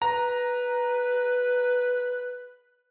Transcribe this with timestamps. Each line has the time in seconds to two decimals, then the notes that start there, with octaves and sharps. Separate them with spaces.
0.02 B4 A#5